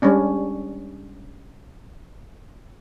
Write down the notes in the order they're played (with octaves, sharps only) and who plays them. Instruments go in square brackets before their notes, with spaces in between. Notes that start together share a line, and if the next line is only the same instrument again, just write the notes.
[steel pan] G3 G#3 C#4 D4